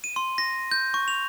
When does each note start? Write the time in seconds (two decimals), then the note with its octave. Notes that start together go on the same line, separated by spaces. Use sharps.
0.04 D#7
0.16 C6
0.38 A#6
0.71 G6
0.94 C#6
1.08 F7